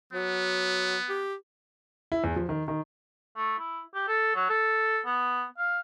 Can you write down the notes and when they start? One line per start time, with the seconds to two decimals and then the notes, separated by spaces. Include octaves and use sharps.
0.13 F#3 B3
1.09 G4
2.12 E4
2.24 E2
2.36 F3
2.49 D#3
2.68 D#3
3.36 A3
3.59 E4
3.95 G4
4.08 A4
4.35 F#3
4.49 A4
5.06 B3
5.58 F5